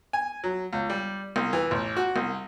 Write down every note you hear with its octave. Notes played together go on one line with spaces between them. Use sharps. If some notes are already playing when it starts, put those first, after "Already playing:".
G#5
F#3
C#2
G3
C2
E3
A1
F#4
C2